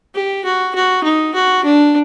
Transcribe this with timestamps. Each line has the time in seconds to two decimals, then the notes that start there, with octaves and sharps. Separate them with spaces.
0.15 G4
0.45 F#4
0.75 F#4
1.04 D#4
1.35 F#4
1.65 D4